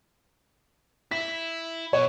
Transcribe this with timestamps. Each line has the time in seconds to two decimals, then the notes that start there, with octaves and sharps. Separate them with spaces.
1.11 E4 B6
1.93 B2 C#5